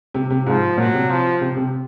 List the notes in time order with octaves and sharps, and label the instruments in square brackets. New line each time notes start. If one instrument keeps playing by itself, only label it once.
[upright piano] C3
C3
[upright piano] G#2 [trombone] F3
[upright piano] A#2 [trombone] F#3
[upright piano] C3
[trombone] F3
[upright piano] C3
C3